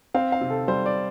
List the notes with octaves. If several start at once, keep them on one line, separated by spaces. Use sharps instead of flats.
C4 F5
F5
C3
A4
G3 C5
D5